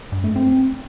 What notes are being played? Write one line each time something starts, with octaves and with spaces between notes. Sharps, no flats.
G2
A3
C4